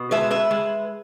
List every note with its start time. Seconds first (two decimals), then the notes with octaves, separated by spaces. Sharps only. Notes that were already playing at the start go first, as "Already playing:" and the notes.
Already playing: B2
0.11 G#3 B4 E5
0.31 B4 E5
0.51 G#3